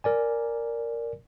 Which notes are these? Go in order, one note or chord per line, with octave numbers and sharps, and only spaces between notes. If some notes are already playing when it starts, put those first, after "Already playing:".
A#4 D5 G#5